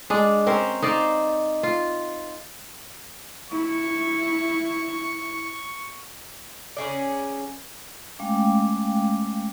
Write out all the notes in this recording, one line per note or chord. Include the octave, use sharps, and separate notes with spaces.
G#3 D4
C4 C#4 A#4 C5
D#4 C5 D5 F5
F4
E4 C#6
C#3 C#4 G#4 D5
G#3 A3 C#4 F5 G5 D6